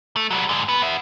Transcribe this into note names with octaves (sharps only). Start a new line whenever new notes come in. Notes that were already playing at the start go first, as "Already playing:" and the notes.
A3
F#3 G3
G#2 D3
B3
B3 E5